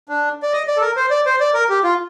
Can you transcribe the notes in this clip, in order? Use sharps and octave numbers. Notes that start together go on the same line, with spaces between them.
D4
D5
D#5
D5
A4
A#4
C5
D5
C5
D5
A#4
G4
F4